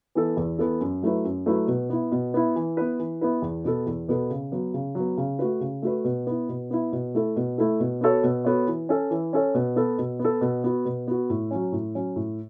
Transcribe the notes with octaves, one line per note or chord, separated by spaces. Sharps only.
E3 B3 A4
E2
E3 B3 A4
F#2
F#3 A3 E4 B4
F#2
F#3 A3 E4 B4
B2
B3 E4
B2
B3 E4
E3
B3 E4 B4
E3
B3 E4 B4
E2
B2 B3 A4
E2
B2 B3 A4
C#3
F#3 B3
C#3
F#3
B3
C#3
A3 F#4 B4
C#3
A3 F#4 B4
B2
B3 E4
B2
B3 E4
B2
A3 E4 A4
B2
A3 E4 A4
B2
B3 F#4 A4 C#5
B2
B3 F#4 A4 C#5
E3
C#4 A4 C#5
E3
C#4 A4 C#5
B2
B3 A4
B2
B3
A4
B2
B3 F#4
B2
B3 F#4
A2
F#3 C#4
A2
F#3 C#4
A2